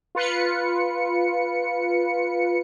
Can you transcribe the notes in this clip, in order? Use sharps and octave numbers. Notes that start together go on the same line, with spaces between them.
F4 B4 C#7